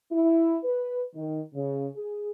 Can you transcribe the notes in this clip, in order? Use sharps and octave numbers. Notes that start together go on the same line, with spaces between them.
E4
B4
D#3
C#3
G#4